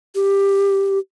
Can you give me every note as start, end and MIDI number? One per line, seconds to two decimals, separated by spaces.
0.15 0.98 67